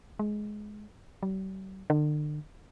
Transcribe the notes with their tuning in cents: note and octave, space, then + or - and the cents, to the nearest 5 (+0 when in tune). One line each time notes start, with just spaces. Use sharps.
G#3 +15
G3 -45
D3 +40